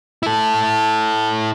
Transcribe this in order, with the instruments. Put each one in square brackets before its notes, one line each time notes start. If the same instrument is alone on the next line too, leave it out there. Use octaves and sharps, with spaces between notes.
[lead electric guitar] E4 A4